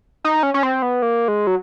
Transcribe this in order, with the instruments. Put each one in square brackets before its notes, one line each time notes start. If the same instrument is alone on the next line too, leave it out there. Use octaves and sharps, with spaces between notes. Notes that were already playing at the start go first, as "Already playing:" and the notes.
[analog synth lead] D#4
C#4
C#4
C4
B3
A#3
G#3
F#3